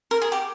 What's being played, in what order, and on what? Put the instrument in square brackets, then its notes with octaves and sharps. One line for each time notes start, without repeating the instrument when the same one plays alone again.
[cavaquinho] A#4
G#4
G4